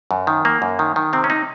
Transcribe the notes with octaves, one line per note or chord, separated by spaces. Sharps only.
F#2
D#3
A#3
F#2
D#3
D#3
C3 C4
C#4
D#4